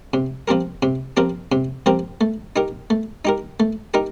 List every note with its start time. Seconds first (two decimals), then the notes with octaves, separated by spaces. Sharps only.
0.14 C3
0.48 F3 C4 G4 A#4
0.83 C3
1.17 F3 C4 G4 A#4
1.52 C3
1.86 F3 C4 G4 A#4
2.21 A3
2.56 D#4 G4 A#4
2.90 A3
3.25 D#4 G4 A#4
3.60 A3
3.94 D#4 G4 A#4